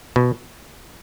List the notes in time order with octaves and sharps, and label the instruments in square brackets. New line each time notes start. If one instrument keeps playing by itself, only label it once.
[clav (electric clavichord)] B2